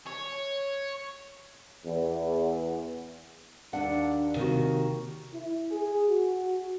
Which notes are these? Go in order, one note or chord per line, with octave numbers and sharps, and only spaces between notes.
C#5
E2
D#2 D4 F#5
D#2 C3 D#3 F#4
E4
G#4
F#4